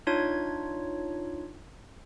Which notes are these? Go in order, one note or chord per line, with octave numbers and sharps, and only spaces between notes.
D4 D#4 F4 C#5 G#6